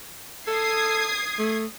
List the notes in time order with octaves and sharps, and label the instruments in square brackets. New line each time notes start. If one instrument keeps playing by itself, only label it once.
[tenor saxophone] A4 [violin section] D#6 G#6 C7
[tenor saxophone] A3